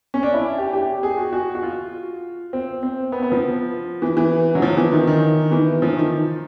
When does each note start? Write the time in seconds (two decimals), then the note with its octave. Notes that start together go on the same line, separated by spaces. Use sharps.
0.14 C#4
0.23 D4
0.34 E4
0.58 G4
0.73 G4
1.03 G#4
1.17 F#4
1.32 F#4
1.55 F#4
1.63 F4
2.53 C4
2.83 C4
3.12 B3
3.22 B3
3.32 F3
4.02 E3
4.17 E3
4.55 F#3
4.62 F3
4.77 E3
4.92 D#3
5.07 D#3
5.51 E3
5.82 F3
5.97 D#3